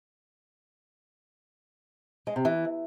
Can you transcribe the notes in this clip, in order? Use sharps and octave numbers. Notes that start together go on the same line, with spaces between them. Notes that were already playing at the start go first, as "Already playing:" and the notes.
G#3
C3
E3